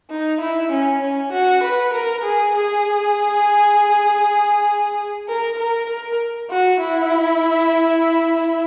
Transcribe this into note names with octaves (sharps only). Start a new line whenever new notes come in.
D#4
E4
C#4
C#4
F#4
B4
A#4
G#4
G#4
A#4
A#4
A#4
F#4
E4